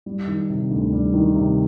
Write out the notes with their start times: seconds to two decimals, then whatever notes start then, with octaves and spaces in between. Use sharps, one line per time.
0.06 G3
0.28 D#3
0.50 C3
0.71 D2
0.92 G3
1.14 D#3
1.36 C3